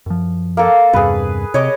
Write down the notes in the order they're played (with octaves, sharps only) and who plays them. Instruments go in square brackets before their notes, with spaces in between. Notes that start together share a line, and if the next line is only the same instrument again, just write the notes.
[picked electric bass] F#2 F3
[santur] A#3 A4 A5
[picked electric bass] E2 G2 C3 [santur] G#4 B4
[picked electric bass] C3 [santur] C#5 D#5 D6